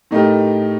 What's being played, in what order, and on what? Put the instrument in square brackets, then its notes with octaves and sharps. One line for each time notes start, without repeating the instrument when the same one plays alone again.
[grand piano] A2 A3 D#4 G4 A#4